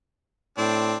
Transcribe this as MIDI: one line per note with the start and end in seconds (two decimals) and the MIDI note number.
0.58 0.95 45
0.58 0.96 60
0.58 0.96 62